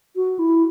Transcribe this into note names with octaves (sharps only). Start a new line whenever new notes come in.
F#4
E4